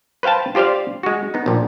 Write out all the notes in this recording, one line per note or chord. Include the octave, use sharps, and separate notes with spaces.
B4 C5 F5 G5 A5
F4 G4 C5 D5 F5
G#3 F#4
B3 D#4
A#1 A#2